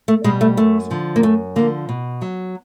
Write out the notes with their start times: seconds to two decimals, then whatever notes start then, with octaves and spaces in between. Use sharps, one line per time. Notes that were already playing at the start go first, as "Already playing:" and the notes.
0.08 A3
0.24 B2 G3 G#3
0.41 A3
0.57 F#2 A3
0.91 D3 F3
1.16 A#3
1.23 F#2 A3
1.56 D3 F3 A#3
1.89 B2
2.22 F#3